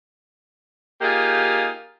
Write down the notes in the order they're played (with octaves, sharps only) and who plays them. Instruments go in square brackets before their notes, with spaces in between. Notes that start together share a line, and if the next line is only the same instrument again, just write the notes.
[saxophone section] A#3 D#4 F4 G4 G#4